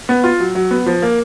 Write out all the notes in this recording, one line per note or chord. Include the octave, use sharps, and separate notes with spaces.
B3
F4
F#3
F#3
B3
F3
A#3